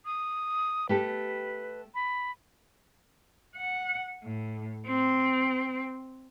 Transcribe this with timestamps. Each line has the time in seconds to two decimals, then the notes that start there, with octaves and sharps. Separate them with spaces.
0.06 D#6
0.89 A3 G4 A4 B4
1.95 B5
3.56 F#5
4.24 A2
4.87 C4